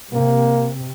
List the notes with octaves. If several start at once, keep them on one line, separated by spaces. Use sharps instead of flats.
C3 A#3